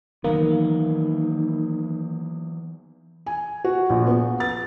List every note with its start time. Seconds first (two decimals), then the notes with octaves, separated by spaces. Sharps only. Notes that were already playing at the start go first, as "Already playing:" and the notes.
0.24 D#3 E3 F#3 A#3 B3
3.26 G#5
3.64 F#4
3.90 A#1
4.07 B3
4.40 A6